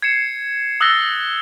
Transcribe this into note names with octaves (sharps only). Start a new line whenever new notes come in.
G#6 C7 C#7 E7
D#6 E6 F#6 A6 A#6 G7